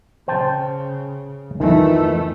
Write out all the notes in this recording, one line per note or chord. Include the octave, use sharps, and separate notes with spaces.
C#3 C5 G5 A5
F2 D#3 E3 A3